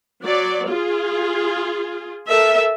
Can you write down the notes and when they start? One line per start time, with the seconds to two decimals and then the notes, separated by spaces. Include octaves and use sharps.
0.23 F#3 D5
0.68 F4 G#4
2.28 A4 A#4 E5